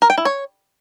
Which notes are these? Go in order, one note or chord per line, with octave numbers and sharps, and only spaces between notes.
A#4
G5
E4
C#5